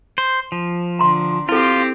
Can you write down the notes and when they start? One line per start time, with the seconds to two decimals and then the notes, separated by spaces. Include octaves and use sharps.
0.18 C5
0.52 F3
0.99 D3 A#5 C6
1.49 C4 E4 F4 G4 A4